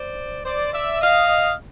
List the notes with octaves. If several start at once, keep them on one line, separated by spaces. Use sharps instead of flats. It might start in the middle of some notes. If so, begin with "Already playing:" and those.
Already playing: C5 D5
C5 D5
D5 E5
D#5 F5